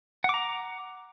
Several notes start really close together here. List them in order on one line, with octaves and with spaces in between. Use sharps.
F#5 D6 A#5